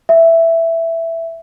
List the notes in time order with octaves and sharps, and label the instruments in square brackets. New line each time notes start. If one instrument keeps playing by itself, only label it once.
[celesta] E5